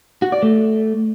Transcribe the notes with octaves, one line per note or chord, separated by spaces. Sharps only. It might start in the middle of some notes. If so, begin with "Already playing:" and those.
F#4
D5
A3